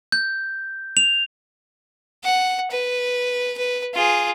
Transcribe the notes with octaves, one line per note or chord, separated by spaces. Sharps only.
G6
F7
F#5
B4
B4
F4 G#4